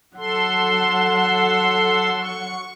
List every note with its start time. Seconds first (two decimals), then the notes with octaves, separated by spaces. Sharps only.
0.17 F#3 A4 F#5 C6
2.21 C#6